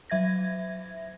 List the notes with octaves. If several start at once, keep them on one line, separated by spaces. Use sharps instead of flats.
F#3 E5 G#6 A#6